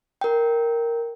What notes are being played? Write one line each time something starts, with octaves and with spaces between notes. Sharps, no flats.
A#4 G5